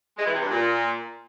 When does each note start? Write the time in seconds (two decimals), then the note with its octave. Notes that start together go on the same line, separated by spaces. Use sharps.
0.18 G#3
0.26 E3
0.34 C3
0.42 G2
0.50 A#2